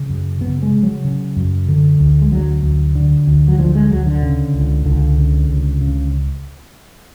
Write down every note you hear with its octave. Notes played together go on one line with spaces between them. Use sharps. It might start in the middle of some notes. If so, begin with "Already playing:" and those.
Already playing: C#3
F#2
C#3 B3
G#3
C#3
F#3
C#3
F#2
D3
D2
G#3
D2 F#3
D2
D3
D2
F#3
D2 F3
G#3
D2 F#3
D3
C#3
C#2
C#2 D3
C#3
C#2
C#3